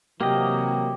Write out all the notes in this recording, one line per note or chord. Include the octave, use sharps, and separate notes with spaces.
C3 E3 F#3 A#3 G4 D#5